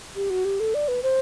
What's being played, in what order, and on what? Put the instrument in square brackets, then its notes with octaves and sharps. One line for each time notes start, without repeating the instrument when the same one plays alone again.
[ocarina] G4
F#4
G4
A4
D5
B4
C5